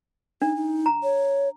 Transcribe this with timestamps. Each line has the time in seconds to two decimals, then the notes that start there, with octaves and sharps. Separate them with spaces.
0.42 D4 D#4
0.56 D#4
0.86 A#5
1.03 C#5